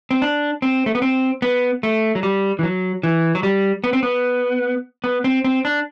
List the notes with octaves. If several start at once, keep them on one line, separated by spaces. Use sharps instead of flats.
C4
D4
C4
A3
B3
C4
B3
A3
F#3
G3
E3
F#3
E3
F#3
G3
B3
C4
B3
B3
C4
C4
D4